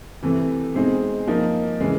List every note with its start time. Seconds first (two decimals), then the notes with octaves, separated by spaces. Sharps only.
0.22 C3 E3 A3
0.75 B2 G#3 C4 D#4
1.27 F3 A#3 D#4
1.81 C#3 E3 G#3